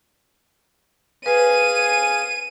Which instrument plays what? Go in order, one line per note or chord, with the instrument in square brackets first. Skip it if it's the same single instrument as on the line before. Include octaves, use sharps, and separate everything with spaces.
[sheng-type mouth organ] G#4 F5 G#5 [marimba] B4 [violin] D#7